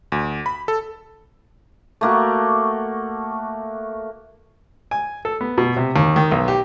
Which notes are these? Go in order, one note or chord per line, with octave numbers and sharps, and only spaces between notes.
D2
B5
A4
A3 A#3 F#4
G#5
A4
B3
B2
C3
D#2
D#3
B1
G4